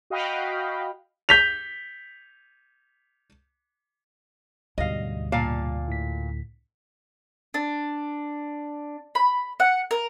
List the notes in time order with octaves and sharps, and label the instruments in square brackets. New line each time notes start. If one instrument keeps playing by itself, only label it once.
[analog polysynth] F#4 D#5 F5 G5 B5
[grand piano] G6 B6 F7
[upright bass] D2 [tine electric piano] G#2 B2 G3 [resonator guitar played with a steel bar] D#5 F5
[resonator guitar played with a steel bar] A#2 F5 A5
[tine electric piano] A2 B6
[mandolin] D4
B5
F#5
A#4